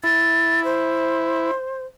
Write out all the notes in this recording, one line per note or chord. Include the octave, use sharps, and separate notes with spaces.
E4 A6
C5